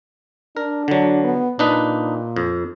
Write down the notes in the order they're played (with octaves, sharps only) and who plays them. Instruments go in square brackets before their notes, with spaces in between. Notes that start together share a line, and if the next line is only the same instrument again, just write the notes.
[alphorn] D4 [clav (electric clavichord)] A#4
[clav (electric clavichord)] D3 F#3
[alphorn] B3
[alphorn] A#2 [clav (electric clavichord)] D4 D#4 B4
[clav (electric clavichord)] F2